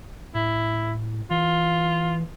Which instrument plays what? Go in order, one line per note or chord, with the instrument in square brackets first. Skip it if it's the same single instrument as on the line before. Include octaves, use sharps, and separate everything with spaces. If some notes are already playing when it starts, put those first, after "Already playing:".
[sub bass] A2 [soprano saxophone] E4
[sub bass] E3 [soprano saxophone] F4